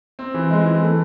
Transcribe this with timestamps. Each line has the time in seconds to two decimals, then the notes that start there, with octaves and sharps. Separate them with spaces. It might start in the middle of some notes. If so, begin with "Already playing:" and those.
0.19 C4
0.34 E3
0.50 G#3
0.66 E3
0.82 A3